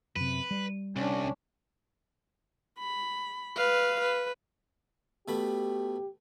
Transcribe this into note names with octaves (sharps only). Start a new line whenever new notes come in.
F#2 C3 B4
G3
C2 C#4 D4
B5
B4 F5
B4
B2 A3 G4 B5